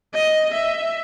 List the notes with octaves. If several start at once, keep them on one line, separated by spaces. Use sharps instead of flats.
D#5
E5